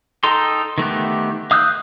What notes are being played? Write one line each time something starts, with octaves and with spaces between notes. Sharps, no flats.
D#4 A4 G5 A#5 C6
D#3 A3 B3 G4
F5 D#6 E6 F#6 G6